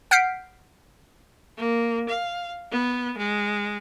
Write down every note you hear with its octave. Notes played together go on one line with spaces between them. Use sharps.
F#5 F6 G6 B6 C7 D7
A#3
F5
B3
G#3